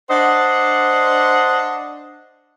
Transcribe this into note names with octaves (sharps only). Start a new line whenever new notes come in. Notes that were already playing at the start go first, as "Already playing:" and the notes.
D4 C5 D#5 F#5